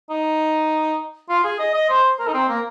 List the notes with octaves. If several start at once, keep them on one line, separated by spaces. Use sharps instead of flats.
D#4
F4
G#4
D#5
D#5
C5
A#4
D#4
C4
A#3